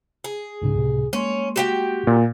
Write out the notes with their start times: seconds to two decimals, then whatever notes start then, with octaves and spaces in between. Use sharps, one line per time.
0.24 G#4
0.62 C2 G#2 C#3
0.75 C#2 A2 C3
1.13 G#3 A#3 C#4 C6
1.56 F#4 G4 G5
2.07 A#2